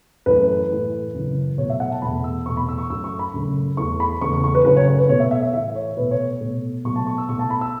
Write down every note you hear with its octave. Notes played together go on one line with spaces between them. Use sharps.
F#2 E3 A3 B4
A2 E3 A3
F#2 C#3 E3
B2 F#3 A3 C#5
E5
F#5
A5
E2 B2 A3 B5
E6
E2 B2 A3 C#6
B5
E6
C#6
F#2 F#3 A3 E6
C#6
B5
F#2 C#3 A3
E2 E3 A3 C#6
B5
E2 C#3 A3 C#6
C#6
C#6
B4
F#2 C#3 F#3 A3 B4
C#5
C#5
B4
B2 A3 C#5
E5
E5
E5
A2 E3 A3 E5
C#5
B2 A3 B4
C#5
B2 A3
B2 F#3 A3 C#6
A5
C#6
E6
B2 A3 C#6
A5
B5
E6